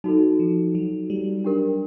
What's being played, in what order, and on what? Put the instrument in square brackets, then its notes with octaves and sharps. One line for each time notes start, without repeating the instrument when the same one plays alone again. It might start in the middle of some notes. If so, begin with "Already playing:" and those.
[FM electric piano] F#3 [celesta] D#4 F#4 A4
[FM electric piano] F3
F#3
G3
[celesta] D4 G4 A#4